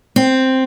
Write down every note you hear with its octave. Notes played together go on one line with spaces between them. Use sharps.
C4